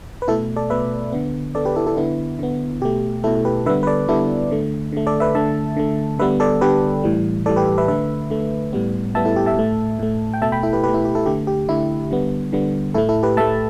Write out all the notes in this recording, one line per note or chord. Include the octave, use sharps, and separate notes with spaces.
B4
B2 A3 E4 A4
A4 D5
B2 A3 B4 E5
D3 B3
D3 B3 A4 D5
G4 B4
E4 A4
E4 A4
D3 B3 E4
D3 B3
B2 A3 G4
B2 A3 E4 A4
G4 B4
D3 G3 B3 B4 E5
B4
A4 D5
D3 G3 B3 E4 A4
D3 A3
D3 A3
A4 D5
B4 E5
D3 A3 E5 A5
D3 A3
D3 G3 B3 B4 E5
A4 D5
D3 G3 B3 G4 B4
A2 E3 G3
A2 E3 G3 A4 D5
G4 B4
B4 E5
D3 A3 B4 E5
D3 A3
A2 G3 B3
A2 G3 B3 E5 A5
E4 A4
G4
E5 A5
A2 A3
A2 A3
G5
B2 A3 E5 A5
G5 B5
E4 A4
G4 B4
B2 A3 G4 B4
E4
G4
E4 A4
D3 A3 G4
G4
D3 A3 E4
D3 G3 B3
D3 G3 B3
A2 A3 E4 A4
E4 A4
G4 B4
A2 A3 E5 A5